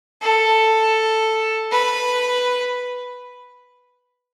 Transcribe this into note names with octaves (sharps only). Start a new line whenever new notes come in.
A4
B4